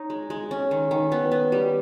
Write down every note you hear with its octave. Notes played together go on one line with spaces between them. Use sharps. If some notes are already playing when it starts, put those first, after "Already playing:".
Already playing: D#4 C#5
G#3
G#3
C#4
D#3
D#3
B3
B3
G3